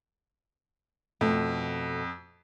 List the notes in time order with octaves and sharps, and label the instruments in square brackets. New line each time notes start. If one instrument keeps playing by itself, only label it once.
[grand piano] F2 [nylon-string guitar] B2 A3